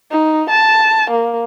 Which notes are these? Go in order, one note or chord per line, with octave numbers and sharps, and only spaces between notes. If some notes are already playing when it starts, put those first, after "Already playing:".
D#4
A5
A#3